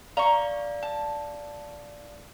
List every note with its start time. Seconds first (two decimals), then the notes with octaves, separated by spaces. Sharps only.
0.17 D5 F5 A#5 C#6
0.83 A5